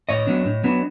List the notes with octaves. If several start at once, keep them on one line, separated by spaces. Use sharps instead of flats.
A2 C#5 D#5
F#3 B3 D4
A2
F#3 B3 D4